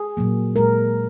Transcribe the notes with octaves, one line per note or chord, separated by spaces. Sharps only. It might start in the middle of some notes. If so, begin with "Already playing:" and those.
Already playing: G#4
A#2 F#3 A#3
A#2 G#3 A#4